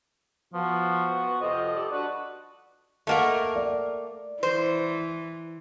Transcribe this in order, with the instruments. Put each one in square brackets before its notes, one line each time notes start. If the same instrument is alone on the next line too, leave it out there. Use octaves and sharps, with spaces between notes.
[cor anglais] F3 [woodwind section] B3 F#4
[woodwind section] F2 C3 F3 [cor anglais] D#5
[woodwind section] G3 A4 D5
D4 F#4 B4
[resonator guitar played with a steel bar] A3 A#3 A#4 [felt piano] D#5 E5 F#5
[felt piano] D5
[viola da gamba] E3 [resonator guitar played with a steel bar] C5